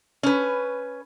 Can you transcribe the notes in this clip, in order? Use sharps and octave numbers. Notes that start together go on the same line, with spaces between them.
C#4 B4